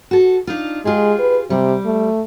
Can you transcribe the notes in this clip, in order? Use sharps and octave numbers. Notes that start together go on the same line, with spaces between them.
F#4 A4
D4 D#4 F4
G#3 F4 G4 G#4
B4
C3 G3
A3